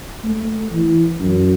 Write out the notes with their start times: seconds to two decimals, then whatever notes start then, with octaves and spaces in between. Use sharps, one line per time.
0.24 A3
0.72 E3
1.21 F#2